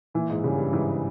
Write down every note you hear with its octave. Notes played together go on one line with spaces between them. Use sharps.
A#2 E3
G#2
G2 C#3
G2
G#2 E3